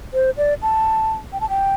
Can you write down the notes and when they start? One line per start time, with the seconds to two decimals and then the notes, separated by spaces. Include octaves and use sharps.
0.14 C5
0.37 D5
0.62 A5
1.33 G5
1.41 A5
1.49 G5